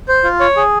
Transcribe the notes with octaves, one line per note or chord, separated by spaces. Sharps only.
C5
F4
C#5
G#4